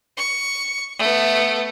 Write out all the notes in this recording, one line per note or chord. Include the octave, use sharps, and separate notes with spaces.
C#6
A3 B3